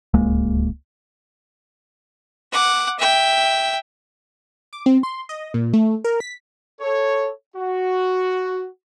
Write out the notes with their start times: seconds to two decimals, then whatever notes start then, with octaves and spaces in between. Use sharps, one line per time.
0.14 D1 C#2 G#3 A#3
2.52 F#5 D6
2.98 E5 G5
4.73 D6
4.86 C4
5.03 C6
5.29 D#5
5.54 A#2
5.73 A3
6.04 A#4
6.20 B6
6.80 A4 C#5
7.56 F#4